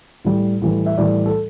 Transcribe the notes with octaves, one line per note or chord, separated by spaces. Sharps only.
A2 G3
A2 E3 G3
E5
A2 E3 G3 D5
A4